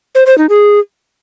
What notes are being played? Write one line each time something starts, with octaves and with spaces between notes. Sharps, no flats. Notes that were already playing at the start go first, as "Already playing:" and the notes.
C5
C5
D#4
G#4